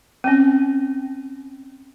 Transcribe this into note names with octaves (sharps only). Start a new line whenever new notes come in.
C4 C#4